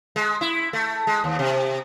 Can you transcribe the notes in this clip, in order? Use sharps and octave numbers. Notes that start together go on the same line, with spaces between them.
G#3
E4
A3
G#3
D#2
C3